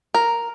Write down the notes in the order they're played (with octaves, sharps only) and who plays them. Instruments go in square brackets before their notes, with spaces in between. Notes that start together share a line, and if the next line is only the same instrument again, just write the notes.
[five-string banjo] A#4